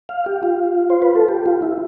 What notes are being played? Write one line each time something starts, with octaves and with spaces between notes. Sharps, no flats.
F5
G4
F4
C5
B4
A4
G4
F4
E4